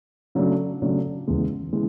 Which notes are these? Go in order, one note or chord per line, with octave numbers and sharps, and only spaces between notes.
C#3 F#3 A3 D4
C#3 F#3 A3 D4
E2 C#3 E3 G#3
C#3 E3 G#3